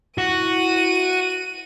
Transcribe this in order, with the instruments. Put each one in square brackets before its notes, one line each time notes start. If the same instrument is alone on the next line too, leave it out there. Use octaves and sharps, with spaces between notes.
[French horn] E4 [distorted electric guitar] F#4 [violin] D#7